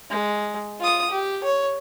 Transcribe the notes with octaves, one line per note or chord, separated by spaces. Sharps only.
G#3
F4 D#6
G4
C#5